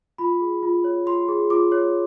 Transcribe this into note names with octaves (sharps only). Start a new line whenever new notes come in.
F4 B5
G#4
F4
C#5
F4 C6
G#4
F4 D6
C#5